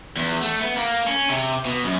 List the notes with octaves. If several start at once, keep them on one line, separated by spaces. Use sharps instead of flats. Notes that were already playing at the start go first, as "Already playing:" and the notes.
E2
A3
B3
A#3
C#4
C3
B2
F#2